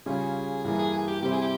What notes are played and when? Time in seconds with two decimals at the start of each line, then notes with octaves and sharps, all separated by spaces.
0.06 C#3 G3 C#4 F4 G#4
0.64 G2 E3 A#3 G#4
0.79 G#4
0.93 G#4
1.08 G4
1.22 C3 G3 C4 E4 G4
1.32 G#4
1.41 G4